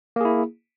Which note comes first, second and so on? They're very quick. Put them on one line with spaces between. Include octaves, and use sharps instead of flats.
A#3 G#4 E4